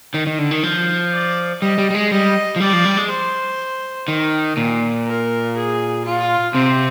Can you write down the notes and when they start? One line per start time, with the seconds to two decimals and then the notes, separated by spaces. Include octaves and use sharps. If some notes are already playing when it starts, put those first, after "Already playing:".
0.14 D#3
0.27 D#3
0.39 D3
0.51 D#3
0.63 F3
1.12 D5
1.62 G3 D#5
1.78 G3
1.90 G3
1.95 G#3
2.11 G3 D#5
2.56 F3
2.60 G3 D5
2.73 F3
2.85 G3
2.97 G#3
3.09 C5
4.08 D#3
4.57 A#2
5.06 A#4
5.56 G#4
6.05 F4
6.54 C3 C4